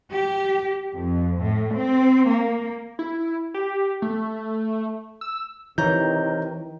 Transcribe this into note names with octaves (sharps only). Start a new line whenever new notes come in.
G4
F2
A2
C4
A#3
E4
G4
A3
E6
C3 D#3 E3 C#5 A#5 G6